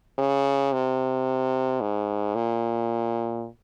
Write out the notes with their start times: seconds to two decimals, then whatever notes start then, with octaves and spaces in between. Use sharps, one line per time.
0.19 C#3
0.73 C3
1.81 G#2
2.35 A#2